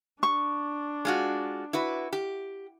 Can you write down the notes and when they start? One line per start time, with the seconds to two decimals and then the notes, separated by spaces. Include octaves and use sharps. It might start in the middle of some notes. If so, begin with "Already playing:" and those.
0.23 D4 C#6
1.05 G#3 F4 F#4
1.73 E4 F#4 B4
2.13 G4